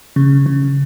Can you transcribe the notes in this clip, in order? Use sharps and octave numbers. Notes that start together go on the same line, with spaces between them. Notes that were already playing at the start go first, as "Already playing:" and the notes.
C#3
C#3